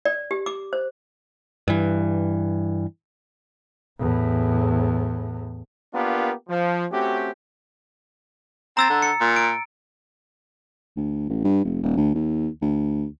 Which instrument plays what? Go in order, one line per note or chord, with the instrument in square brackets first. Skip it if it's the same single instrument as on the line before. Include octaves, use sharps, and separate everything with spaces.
[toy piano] D5
G4
D6
C5
[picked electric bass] G2 E3
[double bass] E2 A2
[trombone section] A#3 B3 D4 F4 G4 A#4
F3
A3 C4 C#4 F#4 G4
[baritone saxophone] C4 [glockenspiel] A#5 E6 A6
[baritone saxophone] D3
[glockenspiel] C#7
[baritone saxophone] A#2
[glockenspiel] D7
[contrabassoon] D2
A1
G2
F1
D#1
D2
D#2
D2